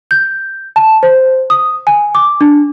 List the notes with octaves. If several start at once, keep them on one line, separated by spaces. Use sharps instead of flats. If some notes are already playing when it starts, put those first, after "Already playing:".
G6
A5
C5
D#6
G#5
D6
D4